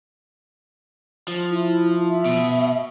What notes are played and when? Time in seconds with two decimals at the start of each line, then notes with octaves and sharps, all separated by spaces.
1.28 F3
1.50 E4
2.10 E5
2.25 B2